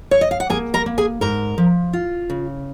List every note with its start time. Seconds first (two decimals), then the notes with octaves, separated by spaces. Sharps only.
0.11 C#5
0.21 D#5
0.31 F5
0.40 F#5
0.50 A#3 G#4 G#5
0.74 A#4 A#5
0.86 A#3
0.98 G#4 G#5
1.21 G#2 A#4 A#5
1.58 F3
1.93 F4
2.30 C#3